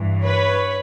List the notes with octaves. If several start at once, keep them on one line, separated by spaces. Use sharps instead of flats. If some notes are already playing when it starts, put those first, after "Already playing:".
Already playing: G2 E3
B4 C#5